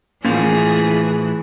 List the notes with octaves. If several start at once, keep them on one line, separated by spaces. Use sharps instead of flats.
A2 E3 F3 A#3 C#4 G#4